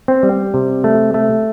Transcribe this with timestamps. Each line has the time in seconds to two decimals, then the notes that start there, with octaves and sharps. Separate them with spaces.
0.08 C4
0.23 G3
0.54 C3
0.84 A3
1.14 A3